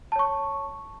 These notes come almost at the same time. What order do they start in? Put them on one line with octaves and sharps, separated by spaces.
A5 C#5 C#6